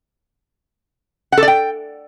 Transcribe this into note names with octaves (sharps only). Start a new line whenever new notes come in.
F#5
A4
D5
G5